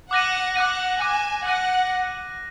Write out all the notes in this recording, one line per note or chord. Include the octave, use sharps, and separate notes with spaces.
F#5 D6 F#6 A#6 D#7
F#5 D6 F#6 A#6 D#7
G#5 D6 F#6 A#6 D#7
F#5 D6 F#6 A#6 D#7